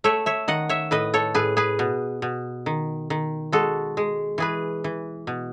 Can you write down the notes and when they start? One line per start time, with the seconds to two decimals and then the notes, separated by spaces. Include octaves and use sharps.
0.04 A3 C#5 E5
0.26 C#5 E5
0.48 D#3 D#5 F#5
0.69 C#5 E5
0.91 A2 B4 D#5
1.14 A4 C#5
1.34 A2 G#4 B4
1.57 G#4 B4
1.79 B2
2.22 B2
2.66 D#3
3.10 D#3
3.52 G#3 F#4 A4
3.97 G#3
4.38 E3 G#4 B4
4.84 E3
5.27 B2